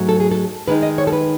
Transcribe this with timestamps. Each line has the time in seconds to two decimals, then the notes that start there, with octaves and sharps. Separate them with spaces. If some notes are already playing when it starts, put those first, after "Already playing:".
Already playing: G#2 F#3 A3
0.09 A4
0.20 G#4
0.31 A4
0.68 D#3 G#3 D#4 B4
0.83 D#5
0.98 C#5
1.07 A4
1.13 B4